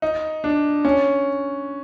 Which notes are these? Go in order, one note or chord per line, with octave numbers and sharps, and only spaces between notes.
D#4
D4
C#4